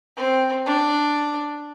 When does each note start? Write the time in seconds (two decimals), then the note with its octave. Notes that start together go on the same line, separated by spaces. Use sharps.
0.17 C4
0.66 D4